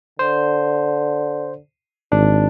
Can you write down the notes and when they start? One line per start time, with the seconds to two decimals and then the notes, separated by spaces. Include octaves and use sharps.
0.19 D3 C5
2.12 G#1 D4